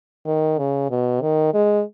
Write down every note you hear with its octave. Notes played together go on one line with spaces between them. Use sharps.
D#3
C#3
B2
D#3
G#3